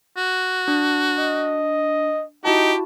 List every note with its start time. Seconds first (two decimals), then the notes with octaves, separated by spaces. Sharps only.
0.17 F#4
0.68 D4
1.18 D#5
2.45 D#4 E4 F#4 G4 A5